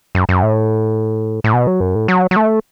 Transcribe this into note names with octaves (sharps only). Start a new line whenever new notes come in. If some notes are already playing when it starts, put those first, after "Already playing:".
F#2
F#2
A2
A2
B2
F#3
F#2
A2
F#3
F#3
A3